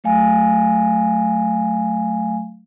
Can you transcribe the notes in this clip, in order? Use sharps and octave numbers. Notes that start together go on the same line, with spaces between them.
F#3 A3 F5 G#5